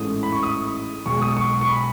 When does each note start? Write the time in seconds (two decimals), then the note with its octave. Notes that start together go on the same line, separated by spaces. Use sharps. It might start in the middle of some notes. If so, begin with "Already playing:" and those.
Already playing: A1 G#2 E3 A3 D#6
0.23 B5
0.32 C#6
0.43 D#6
1.06 B1 B2 G#3 C#6
1.22 D#6
1.37 C#6
1.61 C#6
1.69 B5